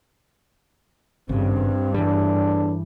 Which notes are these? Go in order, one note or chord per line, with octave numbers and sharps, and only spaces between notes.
G#1 G2 C#3 C4
E2 A2 E3 G3 D4